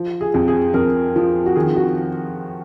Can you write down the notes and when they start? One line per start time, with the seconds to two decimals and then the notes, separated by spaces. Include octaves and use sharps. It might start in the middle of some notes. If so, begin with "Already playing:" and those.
Already playing: F3
0.21 G#4
0.34 F2
0.48 G#4
0.74 F2 A#4
1.16 F3
1.46 F#4
1.55 D#3 G#4
1.76 F#4